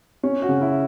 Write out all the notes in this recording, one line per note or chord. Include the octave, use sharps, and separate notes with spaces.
C#4
F#4
C#3
E4